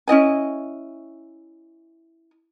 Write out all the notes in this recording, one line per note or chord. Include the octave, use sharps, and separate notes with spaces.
C#4 E4 D#5 G#5